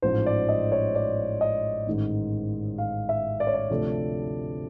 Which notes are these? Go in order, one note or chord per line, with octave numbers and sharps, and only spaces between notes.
A1 G#2 F3 G#3 C5
D5
D#5
C#5
D5
D#5
A1 G#2 D#3 G#3
F5
E5
D5
C#5
D5
D2 C3 F3 A3